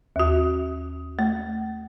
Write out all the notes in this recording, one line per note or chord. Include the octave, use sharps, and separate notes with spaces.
D#2 F#4
A3